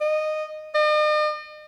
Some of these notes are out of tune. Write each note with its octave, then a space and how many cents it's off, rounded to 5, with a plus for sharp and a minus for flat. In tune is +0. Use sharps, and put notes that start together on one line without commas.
D#5 -15
D#5 -45